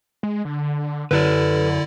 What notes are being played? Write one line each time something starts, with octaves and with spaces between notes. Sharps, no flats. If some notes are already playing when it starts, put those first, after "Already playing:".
G#3
D3
F#2 D3 E4 A4 B4 D5